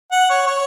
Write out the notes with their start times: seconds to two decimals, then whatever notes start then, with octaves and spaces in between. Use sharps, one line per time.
0.12 F#5
0.30 C#5
0.47 C#5